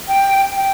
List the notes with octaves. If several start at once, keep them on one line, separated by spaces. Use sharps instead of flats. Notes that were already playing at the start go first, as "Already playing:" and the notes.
G5
G5